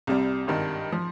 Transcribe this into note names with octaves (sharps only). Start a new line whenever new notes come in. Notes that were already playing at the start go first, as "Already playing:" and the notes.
C2 C3 G3
G#1 G2 D#3
F3